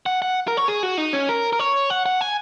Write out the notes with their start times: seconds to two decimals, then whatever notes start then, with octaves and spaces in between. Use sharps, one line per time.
0.06 F#5
0.22 F#5
0.48 A#4
0.57 C#5
0.68 G#4
0.83 F#4
0.98 D#4
1.13 C#4
1.29 A#4
1.53 A#4
1.59 C#5
1.90 F#5
2.06 F#5
2.21 G#5